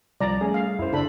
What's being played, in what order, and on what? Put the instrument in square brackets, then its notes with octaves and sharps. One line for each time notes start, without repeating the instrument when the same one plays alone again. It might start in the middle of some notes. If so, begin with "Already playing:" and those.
[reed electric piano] C2 F3 [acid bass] G3 [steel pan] D5 A#5
[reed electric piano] A3 C#4 G#4
[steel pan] F5
[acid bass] F#2 [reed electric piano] E4 C5
[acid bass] C#3 [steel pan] D4 A4 B5